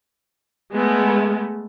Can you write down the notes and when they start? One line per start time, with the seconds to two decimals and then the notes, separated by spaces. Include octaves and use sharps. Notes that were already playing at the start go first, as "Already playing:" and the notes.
0.73 G#3 A3 B3